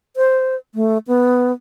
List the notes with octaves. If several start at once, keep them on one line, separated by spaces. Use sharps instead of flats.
C5
A3
B3